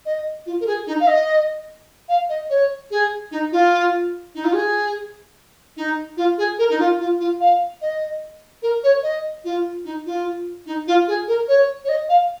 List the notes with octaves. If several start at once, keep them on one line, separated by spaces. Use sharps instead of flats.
D#5
F4
A#4
G#4
D#4
F5
D#5
F5
D#5
C#5
G#4
D#4
F4
D#4
F4
G#4
D#4
F4
G#4
A#4
D#4
F4
F4
F4
F5
D#5
A#4
C#5
D#5
F4
D#4
F4
D#4
F4
G#4
A#4
C#5
C#5
D#5
F5